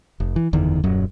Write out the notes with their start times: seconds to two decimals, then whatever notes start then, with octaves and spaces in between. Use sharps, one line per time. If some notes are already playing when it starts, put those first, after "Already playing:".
0.20 F1
0.36 E3
0.53 F#1 E2 D3 D#3
0.84 D#1 F#2 F#3